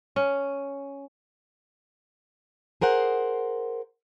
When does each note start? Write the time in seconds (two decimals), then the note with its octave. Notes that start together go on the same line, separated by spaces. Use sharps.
0.16 C#4
2.81 G#4 A#4 C5 F#5